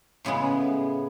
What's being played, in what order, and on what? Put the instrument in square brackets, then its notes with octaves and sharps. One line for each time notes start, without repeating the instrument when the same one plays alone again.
[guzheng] A2 C#3 G#3 B3